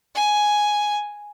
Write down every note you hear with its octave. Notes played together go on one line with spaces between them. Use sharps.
G#5